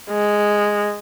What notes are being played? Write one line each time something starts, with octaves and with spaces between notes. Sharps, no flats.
G#3